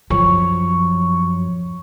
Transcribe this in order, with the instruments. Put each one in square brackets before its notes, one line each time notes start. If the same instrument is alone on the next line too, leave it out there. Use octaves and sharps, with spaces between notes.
[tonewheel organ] F#2 [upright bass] F3 [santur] C#5